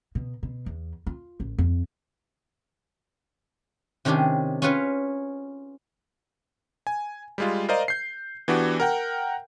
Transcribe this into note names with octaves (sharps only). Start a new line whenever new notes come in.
B2
B2
E2
F4
A1
F2
C3 D#3 C#4 D4 G4 G#4
C#4 F4 G#4 B4 C#5
G#5
G3 G#3 F4
A#4 C5 D5 D#5 F5 A#5
G6 C7
E3 B3 D4 F#4 G4
A#4 F#5 G5